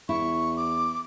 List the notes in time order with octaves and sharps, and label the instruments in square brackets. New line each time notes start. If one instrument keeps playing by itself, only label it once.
[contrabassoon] E2 [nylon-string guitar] E4 [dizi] C#6
[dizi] D6